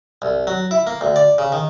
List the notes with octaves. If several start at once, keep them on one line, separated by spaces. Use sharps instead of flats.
C2
F#3
E4
A#3
D2
D5
C#3
D#3